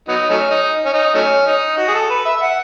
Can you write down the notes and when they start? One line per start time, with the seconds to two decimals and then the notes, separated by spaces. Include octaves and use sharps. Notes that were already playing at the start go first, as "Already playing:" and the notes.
0.08 F#3 B3 D#4
0.30 F#3 A3 C#4
0.51 D#4
0.85 C#4
0.93 D#4
1.14 F#3 A3 C#4
1.46 D#4
1.77 F#4
1.88 G#4
1.94 A4
2.10 B4
2.25 E5
2.37 E5
2.42 F#5